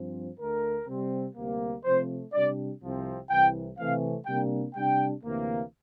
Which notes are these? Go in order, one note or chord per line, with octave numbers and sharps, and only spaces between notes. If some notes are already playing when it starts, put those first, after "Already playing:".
Already playing: G2 F3 C4
D2 D3 A3 A#4
C3 G3 C4
D2 C3 G3 A#3
C3 F3 A3 C4 C5
C3 G3 D4 D5
C2 C3 F3 C4
C2 C3 E3 G5
C3 E3 A3 C4 F5
C3 G3 A#3 D4 G5
C3 G3 D4 G5
D2 C3 E3 A#3